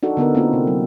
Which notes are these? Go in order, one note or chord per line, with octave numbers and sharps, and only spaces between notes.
D4 D#4 F#4 A4
D3 B3 D#4 A#4
A#3 C4 D#4 F4
C3
F#3